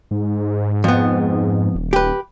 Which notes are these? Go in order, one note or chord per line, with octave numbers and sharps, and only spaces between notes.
G#2
F2 B3
D#1
G4 B4